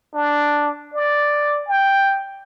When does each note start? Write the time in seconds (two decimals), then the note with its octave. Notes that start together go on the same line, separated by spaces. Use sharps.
0.14 D4
0.94 D5
1.68 G5